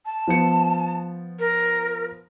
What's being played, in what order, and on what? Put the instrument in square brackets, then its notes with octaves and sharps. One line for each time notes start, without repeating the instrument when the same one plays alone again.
[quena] A5
[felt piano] F3 B3 C#7
[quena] A#4